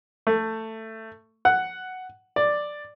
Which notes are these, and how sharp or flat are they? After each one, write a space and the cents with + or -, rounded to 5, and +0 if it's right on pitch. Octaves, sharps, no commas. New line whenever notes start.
A3 +15
F#5 +5
D5 +5